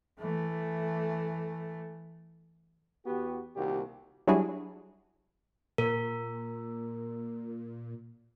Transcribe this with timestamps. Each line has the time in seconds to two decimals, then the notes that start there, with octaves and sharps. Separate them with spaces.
0.19 E3 A3
3.06 E2 B3 F#4 G4
3.55 C2 A#2 D#3 A#3 F#4 G4
4.27 F#3 G3 D4 E4 F#4 G#4
5.78 A#2 A#4